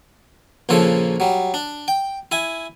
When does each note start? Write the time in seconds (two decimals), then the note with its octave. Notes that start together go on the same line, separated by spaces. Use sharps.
0.69 A#1 A#2 C#3 F3 A4 A5
1.20 F#3 G3
1.54 D4
1.88 G5
2.32 E4 G#5